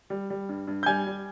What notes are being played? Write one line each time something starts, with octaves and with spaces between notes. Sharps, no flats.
G3
G3
G2
G2
G6
G3 G#5 G#6
G3